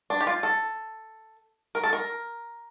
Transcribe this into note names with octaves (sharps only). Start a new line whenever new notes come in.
D4
G4
F4
A4
A#4
A4
A#4